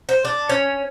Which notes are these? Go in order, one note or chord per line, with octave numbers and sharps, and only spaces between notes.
C5
D4
C#4